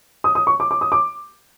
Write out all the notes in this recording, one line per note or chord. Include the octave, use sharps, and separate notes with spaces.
D#6
D#6
C#6
D6
D6
D#6
D6